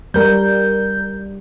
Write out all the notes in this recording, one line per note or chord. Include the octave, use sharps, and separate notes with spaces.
G3 A#4 G6